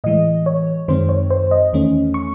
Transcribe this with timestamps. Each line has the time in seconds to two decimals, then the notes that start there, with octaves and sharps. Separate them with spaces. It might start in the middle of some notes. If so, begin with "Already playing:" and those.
0.04 A2 E3 G#3 D#5
0.46 C#5
0.88 F#2 D#3 G#3 C4 C5
1.09 C#5
1.30 C5
1.51 D#5
1.73 E2 D#3 A3 C#4
2.14 C#6